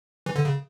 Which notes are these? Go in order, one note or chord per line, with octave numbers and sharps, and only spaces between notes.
E3
D3
C#3